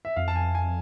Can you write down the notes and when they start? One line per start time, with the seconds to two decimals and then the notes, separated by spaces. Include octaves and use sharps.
0.05 E5
0.16 F2 F5
0.28 A5
0.36 G#5
0.55 G#5